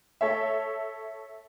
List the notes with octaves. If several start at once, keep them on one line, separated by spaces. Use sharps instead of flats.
A4 C#5 E5